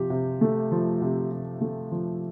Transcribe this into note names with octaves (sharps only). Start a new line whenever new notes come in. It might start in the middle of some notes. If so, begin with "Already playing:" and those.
Already playing: C3 F3 G4
C3
A3
F3
C3
C3
A3
F3